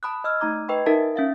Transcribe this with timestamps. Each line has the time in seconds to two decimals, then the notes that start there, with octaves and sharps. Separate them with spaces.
0.03 A5 B5 D#6 F#6
0.24 D#5 E6 F6
0.40 A3 D#4 A#5 D6 G#6
0.68 B4 D#5 G5 B5 C#6
0.86 D#4 A#4 E5 A5
1.16 C#4 E5 F5